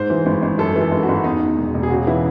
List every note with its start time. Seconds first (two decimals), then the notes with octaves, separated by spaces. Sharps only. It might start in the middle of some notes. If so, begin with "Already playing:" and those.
Already playing: G#2 C5
0.10 E3
0.26 G#1
0.42 G#1
0.58 F#2 A4
0.76 E3
0.81 A4
0.91 G#1
1.03 F#4
1.09 G#1
1.24 E2 D#4
1.41 D#3
1.57 E1
1.74 E1
1.83 G#4
1.90 C#3 F#4
2.07 E3 E4